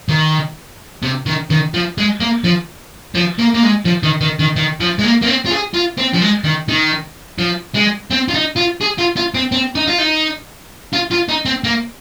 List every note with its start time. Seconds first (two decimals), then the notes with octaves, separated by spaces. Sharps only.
0.09 D#3
1.03 C3
1.26 D#3
1.50 D#3
1.74 F3
1.98 G#3
2.20 A#3
2.44 F3
3.15 F3
3.39 A#3
3.54 A#3
3.63 G#3
3.85 F3
4.03 D#3
4.21 D#3
4.39 D#3
4.56 D#3
4.80 F3
4.99 G#3
5.03 A#3
5.22 A#3
5.27 C4
5.46 F4
5.51 G#4
5.74 F4
5.98 C4
6.14 F3
6.22 G#3
6.45 D#3
6.69 D#3
7.39 F3
7.75 G#3
8.11 C4
8.28 F4
8.34 D#4
8.57 F4
8.81 G#4
8.99 F4
9.16 F4
9.34 C4
9.52 C4
9.75 D#4
9.87 F4
9.98 D#4
10.93 F4
11.11 F4
11.29 D#4
11.45 C4
11.64 A#3